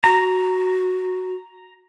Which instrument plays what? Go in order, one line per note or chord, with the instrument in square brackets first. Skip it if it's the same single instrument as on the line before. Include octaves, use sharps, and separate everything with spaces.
[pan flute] F#4 [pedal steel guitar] A#5